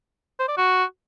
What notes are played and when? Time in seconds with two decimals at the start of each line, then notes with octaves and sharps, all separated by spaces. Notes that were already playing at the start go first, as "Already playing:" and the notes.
0.39 C5
0.48 D5
0.57 F#4